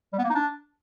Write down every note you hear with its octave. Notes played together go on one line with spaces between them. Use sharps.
G3
B3
A#3
D#4
D4